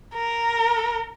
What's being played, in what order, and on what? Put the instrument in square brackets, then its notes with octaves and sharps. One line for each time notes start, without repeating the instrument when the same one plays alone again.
[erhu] A#4